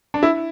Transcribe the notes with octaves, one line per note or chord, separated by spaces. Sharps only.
D4
E4